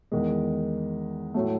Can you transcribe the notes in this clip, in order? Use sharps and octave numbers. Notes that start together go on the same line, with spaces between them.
E2 D#3 G#3
A2 F#3 A3